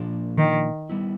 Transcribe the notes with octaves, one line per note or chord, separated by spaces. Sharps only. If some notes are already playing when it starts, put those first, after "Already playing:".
Already playing: A#2 F3 A#3 D4
D#3
G3 B3 E4